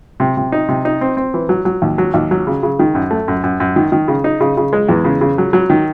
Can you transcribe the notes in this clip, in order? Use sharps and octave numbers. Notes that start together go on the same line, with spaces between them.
C3
C3
D#4
C3
D#4
C4
C4
E3
F#3
F#3
D#2
F#3
D#2
F#3
C#3
C#3
D#3
F#2
A3
F#2
F#2
F#2
D#3
D#3
C#3
D#4
C#3
C#3
G#3
E2
C#3
C#3
F#3
F#3
D#3